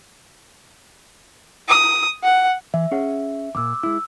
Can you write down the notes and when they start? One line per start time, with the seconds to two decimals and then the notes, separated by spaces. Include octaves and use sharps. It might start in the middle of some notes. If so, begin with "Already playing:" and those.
1.68 D#6
2.24 F#5
2.74 E3 E5
2.91 C#4 G#4 F#5
3.55 E2 A#2 D6 E6
3.83 G#3 E4 E6